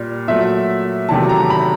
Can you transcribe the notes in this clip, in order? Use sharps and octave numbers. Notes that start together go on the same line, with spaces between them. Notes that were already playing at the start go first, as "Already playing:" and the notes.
Already playing: A#2 G3
A#2 F#3 A3 E5
E2 C3 D#3 F#3 A3 A5
A#5
B5